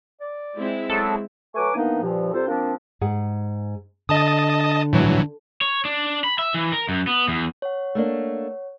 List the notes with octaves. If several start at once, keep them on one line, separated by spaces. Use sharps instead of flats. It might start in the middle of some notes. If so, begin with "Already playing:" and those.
D5
G#3 C4 E4
F#3 B3 A4
F#3 A3 B4 G#5 C#6 D6
D#3 E3 A#3 B3 D4 D#4
G2 A#2 F3
C3 G3 C4 F4 A4 C5
F3 A#3 C4 D4
G#2 G#4 F#5
D3 D#5 A5 D#6
A2 E3 F#3
C#5
D4
B5
E5
E3
A#4
F#2
B3
E2
C#5 F#5
A3 A#3 D4